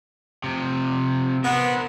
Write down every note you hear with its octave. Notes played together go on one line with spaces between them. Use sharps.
C3 F3
B3 A#4 C5 F#5